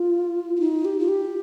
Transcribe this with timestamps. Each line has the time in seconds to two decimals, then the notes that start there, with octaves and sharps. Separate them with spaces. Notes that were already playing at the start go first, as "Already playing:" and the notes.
Already playing: F4
0.56 F4
0.60 D#4
0.85 G4
0.99 F4
1.08 G4